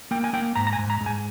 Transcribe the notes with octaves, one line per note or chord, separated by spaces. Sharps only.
A#3 G5
G#5
A#3 G5
G#2 A#5
A#5
G#5
G#2
A#5
G#2
G#5